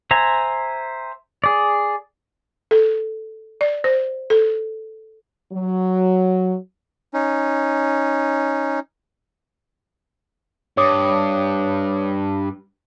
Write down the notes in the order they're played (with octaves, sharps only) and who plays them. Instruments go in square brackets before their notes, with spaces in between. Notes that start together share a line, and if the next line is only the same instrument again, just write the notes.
[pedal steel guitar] C5 E5 G#5 A#5
G#4 D5
[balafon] A4
D5
C5
A4
[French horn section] F#3
[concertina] C#4 D#4
[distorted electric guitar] G2 [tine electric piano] C#5 D6 D#6